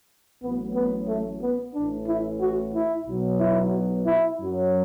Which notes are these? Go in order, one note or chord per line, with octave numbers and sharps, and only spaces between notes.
A1 A2 F#3 B3
B3
A3
B3
A1 A2 E3 D4
E4
F#4
E4
B1 B2 F#3
E4
E4
F#2 F#3